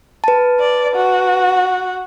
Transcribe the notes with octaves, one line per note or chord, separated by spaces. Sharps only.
B4 A5
D5
F#4